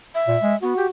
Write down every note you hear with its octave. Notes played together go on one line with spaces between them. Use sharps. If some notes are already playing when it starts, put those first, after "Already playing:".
E5
A#2
G#3
B3 F#4
G4